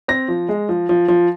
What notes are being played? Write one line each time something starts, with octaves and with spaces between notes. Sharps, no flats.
C4 A#6
F3
G#3
F3
F3
F3